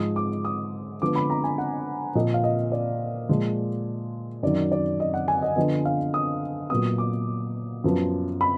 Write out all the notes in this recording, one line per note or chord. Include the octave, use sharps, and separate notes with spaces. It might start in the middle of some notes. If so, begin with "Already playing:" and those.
Already playing: G#2 F3 G#3 D#6
D6
D#6
D3 F3 G#3 B3 D6
B5
A#5
G#5
F#5
A#2 F3 A#3 D#5
F5
D#5
D5
A#2 F3 G#3
F#2 D#3 F#3 D5
D5
D#5
F#5
G#5
D#5
D3 F3 B3 D#5
F5
D#6
A#2 F#3 B3 D#6
D6
F#2 F3 B3
B5